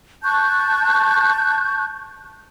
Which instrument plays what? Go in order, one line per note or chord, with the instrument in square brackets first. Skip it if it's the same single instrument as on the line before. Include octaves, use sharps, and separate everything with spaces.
[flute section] A5 C#6 F#6 G6